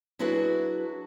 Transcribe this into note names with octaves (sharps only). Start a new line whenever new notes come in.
F#3 D4 E4 F#4 G#4 B4